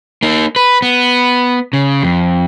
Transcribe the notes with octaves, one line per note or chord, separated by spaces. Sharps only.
A#3 D#4
B4
B3
C#3
F2